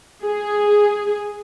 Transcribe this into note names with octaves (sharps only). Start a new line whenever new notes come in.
G#4